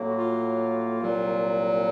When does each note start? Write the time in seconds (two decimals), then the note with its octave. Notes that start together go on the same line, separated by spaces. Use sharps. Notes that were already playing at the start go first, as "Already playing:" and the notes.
Already playing: A2 F#3 A#3
0.10 F#4
0.15 F4
1.00 C2 A#2 F#3